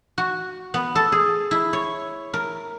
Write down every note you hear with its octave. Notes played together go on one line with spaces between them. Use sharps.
F#4
B3
A4
G#4
E4
C#5
A#4